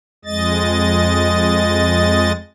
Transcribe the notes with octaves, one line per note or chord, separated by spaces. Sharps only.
F2 G#3 D#5 A6